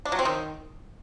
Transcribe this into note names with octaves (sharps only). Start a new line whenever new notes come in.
D4
F#3
C4
D#3